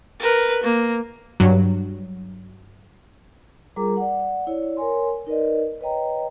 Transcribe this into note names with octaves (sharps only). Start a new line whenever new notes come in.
A#4 B4
A#3
G2 F#3
G3 F4 G#4 A#4 A#5 D6
D5 F#5
E4 C#5 D5
A#4 C#5 G#5 C6
D#4 A#4 B4 D5 D#5
B4 C#5 D#5 G5 A#5